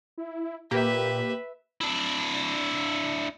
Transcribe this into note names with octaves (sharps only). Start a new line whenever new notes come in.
E4
A#2 A#3 G4 B4 E5
D4 E4